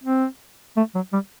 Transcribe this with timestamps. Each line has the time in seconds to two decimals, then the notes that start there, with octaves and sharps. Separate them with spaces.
0.04 C4
0.77 A3
0.95 F#3
1.13 G3